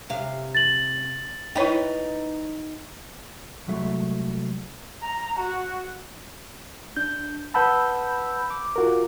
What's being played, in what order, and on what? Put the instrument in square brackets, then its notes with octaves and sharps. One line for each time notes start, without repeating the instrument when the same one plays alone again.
[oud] C3 F5
[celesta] A6 F#7
[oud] D#4 B4 [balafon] E4 C#5 G5
[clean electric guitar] C2 F#3 G#3 A3 F#4 E5
[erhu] A#5
F#4
[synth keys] D4 [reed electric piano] G6
[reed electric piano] B4 F#5 A5 [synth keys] B5 E6 G6
[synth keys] D6
[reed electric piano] F4 F#4 A#4